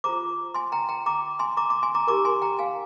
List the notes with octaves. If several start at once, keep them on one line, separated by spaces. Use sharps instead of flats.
F4 G#4 C5 A#5 D6
G#5 C6
G5 A#5
G5 A#5
A#5 D6
G#5 C6
A#5 D6
A#5 D6
G#5 C6
A#5 D6
D#4 G4 A#4 A#5 D6
G#5 C6
G5 A#5
F5 G#5